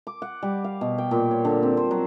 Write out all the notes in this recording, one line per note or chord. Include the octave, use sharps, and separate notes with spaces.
D6
F#5
G3
F5
B2
G5
A#2
C#5
D3
C4
C5
F#3